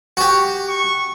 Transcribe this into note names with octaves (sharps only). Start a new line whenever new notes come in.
F#4 G4
C#6